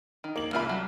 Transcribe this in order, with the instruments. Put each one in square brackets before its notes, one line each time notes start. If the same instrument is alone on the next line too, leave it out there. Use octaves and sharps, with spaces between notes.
[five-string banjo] D#3
[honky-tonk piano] A#3 F#7
[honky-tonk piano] C2 E5 F6 [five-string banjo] A#3 F4 B5
[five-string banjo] F#3 G3